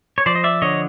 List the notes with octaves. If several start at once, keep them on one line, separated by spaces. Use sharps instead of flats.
C#5
F3 C5 D5
D#5
D5 E5
D3 C#5 D#5